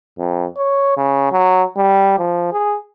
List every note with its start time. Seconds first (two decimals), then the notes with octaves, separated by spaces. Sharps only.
0.18 F2
0.57 C#5
0.97 C#3
1.32 F#3
1.77 G3
2.18 F3
2.52 G#4